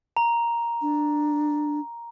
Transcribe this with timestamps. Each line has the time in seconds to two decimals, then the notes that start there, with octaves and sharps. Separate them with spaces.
0.17 A#5
0.82 D4